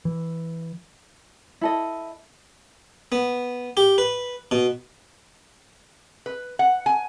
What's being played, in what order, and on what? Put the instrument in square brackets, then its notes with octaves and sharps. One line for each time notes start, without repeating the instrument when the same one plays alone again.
[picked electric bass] E3
[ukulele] E4 A4 D#5
[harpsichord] B3
G4
B4
B2
[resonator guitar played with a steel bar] B4
F#5
G#5